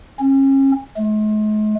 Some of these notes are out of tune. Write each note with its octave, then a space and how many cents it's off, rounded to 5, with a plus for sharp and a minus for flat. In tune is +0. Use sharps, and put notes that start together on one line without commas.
C#4 -35
G#3 +45